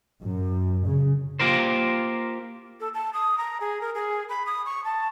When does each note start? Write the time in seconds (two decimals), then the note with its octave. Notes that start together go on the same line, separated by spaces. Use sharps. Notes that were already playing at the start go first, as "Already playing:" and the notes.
0.22 F#2
0.85 C#3
1.39 A#3 F4 G4 A#4 C5
2.80 A4
2.94 A5
3.14 D#6
3.38 A#5
3.61 G#4
3.81 A#4
3.95 G#4
4.29 B5
4.46 D#6
4.66 C#6
4.85 A5